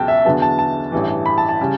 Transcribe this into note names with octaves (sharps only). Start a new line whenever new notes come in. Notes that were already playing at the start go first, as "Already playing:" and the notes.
Already playing: C#2 B2 F#3 G5 A5
E5
E2 D3 F#3 B3 A5
A5
A5
A1 G2 E3
B5
A5
A5
C#3 G3